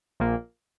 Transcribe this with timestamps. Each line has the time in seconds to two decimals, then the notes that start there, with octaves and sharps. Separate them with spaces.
0.20 A#1 A#2 A#3